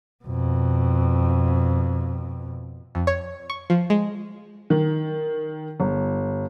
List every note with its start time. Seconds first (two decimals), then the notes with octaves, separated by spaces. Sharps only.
0.24 F2 B2
2.95 F2
3.07 C#5
3.50 C#6
3.70 F3
3.90 G#3
4.70 D#3
5.80 G1